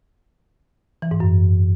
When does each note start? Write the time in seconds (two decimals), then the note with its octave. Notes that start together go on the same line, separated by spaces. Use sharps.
1.02 E3
1.11 G#2
1.20 F#2